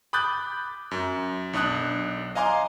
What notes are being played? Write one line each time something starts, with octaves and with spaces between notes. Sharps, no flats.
B5 D6 D#6 F#6 G6 A6
F#2
B1 D4 D#6 F#6
D#5 F5 G#5 A#5 C6 D6